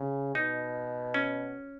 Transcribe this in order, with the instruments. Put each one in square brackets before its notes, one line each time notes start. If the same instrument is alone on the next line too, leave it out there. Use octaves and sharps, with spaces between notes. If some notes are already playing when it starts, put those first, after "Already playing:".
Already playing: [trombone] C#3
[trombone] B2 [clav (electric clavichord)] D#4
[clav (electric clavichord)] C#4